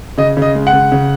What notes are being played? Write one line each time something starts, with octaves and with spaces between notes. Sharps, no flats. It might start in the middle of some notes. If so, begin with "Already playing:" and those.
C#3 D#5
C#3
D#5
G#3
F#5
C#3
C#3